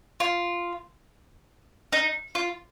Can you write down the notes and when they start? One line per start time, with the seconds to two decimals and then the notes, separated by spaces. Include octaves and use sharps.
0.20 F4
1.92 D#4
2.35 F4